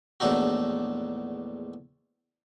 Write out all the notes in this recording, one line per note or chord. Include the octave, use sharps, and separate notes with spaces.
A#1 E2 A2 D4 D#4 F#4